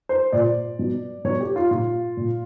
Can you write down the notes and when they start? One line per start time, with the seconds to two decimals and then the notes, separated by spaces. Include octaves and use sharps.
0.09 C5
0.33 A#2 D5
0.79 B2
1.24 B2 C#5
1.40 G4
1.56 F4
1.71 A#2 F4
2.17 A#2